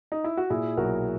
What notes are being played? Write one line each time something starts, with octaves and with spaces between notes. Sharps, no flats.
D#4
E4
F#4
A#2 E4 G#4
B1 F#4 A#4